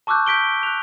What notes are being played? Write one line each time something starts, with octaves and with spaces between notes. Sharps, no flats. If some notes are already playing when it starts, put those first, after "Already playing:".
A5 C#6 D6 E6 F#6 G6
G6 B6 D7 G7
F#6 F7